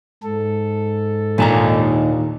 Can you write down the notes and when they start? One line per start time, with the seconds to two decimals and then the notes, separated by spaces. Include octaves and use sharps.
0.23 G#2 A4
1.38 D#2 A#2 D4 D#4 A5 A#5